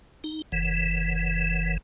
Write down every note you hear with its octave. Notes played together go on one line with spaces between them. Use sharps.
D#4
F#1 E3